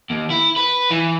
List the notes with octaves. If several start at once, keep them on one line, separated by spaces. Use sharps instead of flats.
D#2
E4
B4
E3